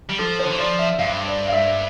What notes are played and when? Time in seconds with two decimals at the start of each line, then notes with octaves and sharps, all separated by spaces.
0.10 G3
0.19 F3 A4
0.39 D3 C5
0.52 E3
0.58 F3 D5
0.79 E5
0.99 G2 F5
1.26 D5
1.48 F5
1.52 E5